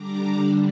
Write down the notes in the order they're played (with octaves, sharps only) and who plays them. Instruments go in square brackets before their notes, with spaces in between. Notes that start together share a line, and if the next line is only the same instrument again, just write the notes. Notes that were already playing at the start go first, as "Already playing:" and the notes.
Already playing: [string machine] D3 G3 D4 A#5 D6